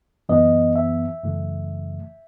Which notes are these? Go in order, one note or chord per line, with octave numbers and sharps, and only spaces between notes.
F#2 E3 B3 D#5
E5
F#2 C#3 E3 A3